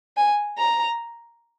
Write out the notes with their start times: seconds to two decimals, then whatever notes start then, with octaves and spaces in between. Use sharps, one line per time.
0.17 G#5
0.58 A#5